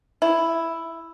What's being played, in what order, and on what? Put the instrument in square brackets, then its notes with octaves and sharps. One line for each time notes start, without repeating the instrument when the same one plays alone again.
[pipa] E4